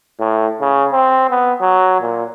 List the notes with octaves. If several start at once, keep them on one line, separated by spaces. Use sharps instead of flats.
A2
C#3
C4
B3
F#3
A#2